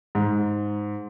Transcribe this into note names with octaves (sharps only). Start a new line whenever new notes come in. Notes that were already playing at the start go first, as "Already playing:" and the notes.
G#2